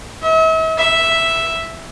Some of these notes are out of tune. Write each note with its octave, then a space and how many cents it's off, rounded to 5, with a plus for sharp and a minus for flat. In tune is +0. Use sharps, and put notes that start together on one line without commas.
E5 -45
E5 +0